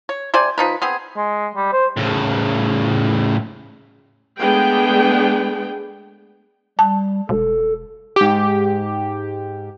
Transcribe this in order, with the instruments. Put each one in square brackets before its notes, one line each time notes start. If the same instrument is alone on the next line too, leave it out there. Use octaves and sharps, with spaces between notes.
[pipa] C#5
C3 C5 D5 G#5
F3 D#4 B4
B3 C4 G#4
[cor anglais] G#3
G3
C5
[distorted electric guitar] A2 C#3
[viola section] G#3 A3 B3 D4 G#4 G5
[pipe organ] G3 [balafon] A5
[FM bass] E1 [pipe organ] A4
[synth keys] G#2 G4